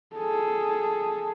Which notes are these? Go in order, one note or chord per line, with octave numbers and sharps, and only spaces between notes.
G#4 A4